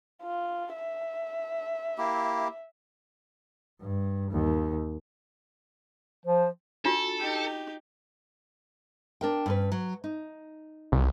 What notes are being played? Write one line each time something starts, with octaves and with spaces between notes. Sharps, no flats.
F4
E5
A#3 E4 G4
G2
D#2
F3 C5
D4 F4 F#4 A4
D#4 G4
D4 A#4 G5
G2 C#4 B4
F#3
D#4
C2